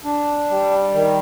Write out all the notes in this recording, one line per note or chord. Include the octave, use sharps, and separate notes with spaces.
D4
G3
D#3